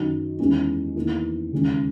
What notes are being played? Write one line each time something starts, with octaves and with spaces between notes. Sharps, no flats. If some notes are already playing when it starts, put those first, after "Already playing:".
Already playing: F#2 D#3 F#3
E2 D#3 G#3 C#4 E4
E2 D#3 A#3 E4
D#2 C#3 G#3 C#4